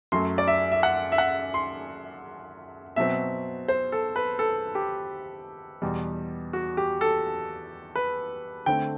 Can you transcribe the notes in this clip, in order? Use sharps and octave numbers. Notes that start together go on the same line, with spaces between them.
F#2 F#3 A3 C6
D5
E5
E5
F#5
E5
F#5
C6
B2 F#3 C4 E5
C5
A4
B4
A4
G4
E2 B2 G3
F#4
G4
A4
B4
D3 A3 C4 G5